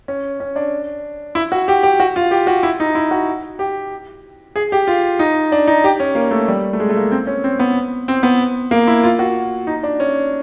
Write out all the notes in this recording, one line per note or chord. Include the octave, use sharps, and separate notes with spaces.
C#4
C#4
D4
E4
F#4
G4
G4
F#4
F4
G4
F#4
E4
D#4
E4
F#4
G4
G#4
G4
F4
D#4
D4
D#4
G4
C#4
A#3
A3
G3
A3
G#3
A3
A#3
C4
C#4
C4
B3
C4
B3
A#3
E4
F4
F#4
D#4
D4
C#4